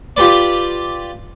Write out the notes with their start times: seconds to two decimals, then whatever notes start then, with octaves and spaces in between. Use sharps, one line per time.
0.17 F4 G4 B4 D5